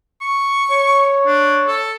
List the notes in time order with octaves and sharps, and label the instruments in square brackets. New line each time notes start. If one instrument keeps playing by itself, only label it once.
[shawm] C#6
[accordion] C#5
[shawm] D4
A4